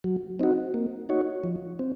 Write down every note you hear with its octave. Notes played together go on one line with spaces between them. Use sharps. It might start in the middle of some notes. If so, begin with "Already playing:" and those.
F#3
C4 D#4 F#4
A#3
D#4 F#4 C#5
F3
C4